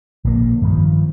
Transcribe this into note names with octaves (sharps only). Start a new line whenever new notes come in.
A#1 D3 D#3 A#3
G2 D#3 F3